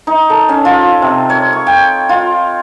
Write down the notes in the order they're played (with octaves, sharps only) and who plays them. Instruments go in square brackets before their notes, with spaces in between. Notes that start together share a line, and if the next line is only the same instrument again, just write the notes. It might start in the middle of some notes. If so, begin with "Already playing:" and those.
[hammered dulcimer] D#4
A4
C#4
F4
C3
C#5
C#6
G5
F4